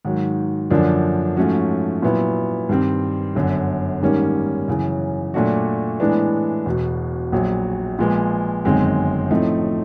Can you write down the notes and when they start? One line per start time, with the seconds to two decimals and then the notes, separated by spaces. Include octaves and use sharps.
0.05 G#2 D#3 F#3
0.71 F#2 D3 F3 A#3 D4
1.36 G#2 F3 A3 C#4 F#4
2.02 A#2 F#3 B3 E4
2.69 G2 D#3 G3 C4
3.35 G1 F#2 D3
4.02 G#2 D#3 G3 A#3 C#4
4.68 F#2 C#3 E3
5.34 A#2 F#3 A3 D4 F#4
6.00 A2 E3 G#3 B3 D4
6.66 E1 E2 B2
7.32 A#1 A#2 F#3
7.99 A#2 F3 G#3 B3
8.65 G1 F#2 D#3 G#3 C4
9.31 A2 F3 A3 C4 D#4